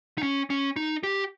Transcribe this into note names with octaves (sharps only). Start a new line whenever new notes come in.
D#4
C#4
C#4
D#4
G4